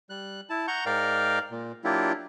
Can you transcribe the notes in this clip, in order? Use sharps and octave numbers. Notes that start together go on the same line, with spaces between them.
G3 F#6
E4 A5
F#5 A#5 C#6 G6
G#2 A#4 D5 F5 G5 F6
A#2
F#3 A#3 D4 E4 F4 G4